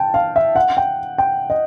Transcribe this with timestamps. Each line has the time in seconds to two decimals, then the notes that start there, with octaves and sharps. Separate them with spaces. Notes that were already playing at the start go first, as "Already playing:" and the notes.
Already playing: G5 A5
0.14 F5
0.36 E5
0.56 F#5
0.77 G5
1.18 G5
1.50 D#5